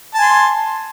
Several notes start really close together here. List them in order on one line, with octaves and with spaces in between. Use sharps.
A5 G#5 C6